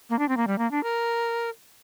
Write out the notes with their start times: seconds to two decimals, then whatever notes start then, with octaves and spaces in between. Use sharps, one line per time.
0.10 A#3
0.19 D4
0.29 C4
0.37 A#3
0.47 G3
0.58 A#3
0.71 D4
0.83 A#4